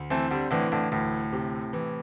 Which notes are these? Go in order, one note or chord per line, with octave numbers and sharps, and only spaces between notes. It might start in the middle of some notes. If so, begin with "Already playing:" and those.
Already playing: D2
E3 A3 C4
D3 G3
A2 D3 E3
A2 D3
D2 A2
C3
E3